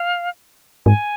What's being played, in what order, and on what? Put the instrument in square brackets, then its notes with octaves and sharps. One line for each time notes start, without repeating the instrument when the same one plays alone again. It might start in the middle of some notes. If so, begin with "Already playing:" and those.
Already playing: [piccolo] F5
[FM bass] G#2 [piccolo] G#5